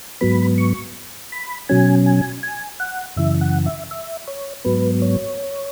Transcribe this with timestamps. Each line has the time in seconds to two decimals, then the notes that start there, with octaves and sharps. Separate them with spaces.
0.21 G#2 F#3 B3 B5
0.58 C#6
1.32 B5
1.69 B2 F#3 C#4 G#5
2.06 G#5
2.43 G#5
2.80 F#5
3.17 F#2 C#3 E3 E5
3.41 F#5
3.66 E5
3.91 E5
4.27 C#5
4.65 G#2 F#3 B3 B4
5.02 C#5